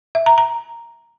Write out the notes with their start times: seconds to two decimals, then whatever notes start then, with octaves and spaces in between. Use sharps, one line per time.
0.15 E5
0.26 A#5
0.38 A#5